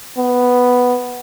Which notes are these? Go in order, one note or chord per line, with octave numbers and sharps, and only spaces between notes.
B3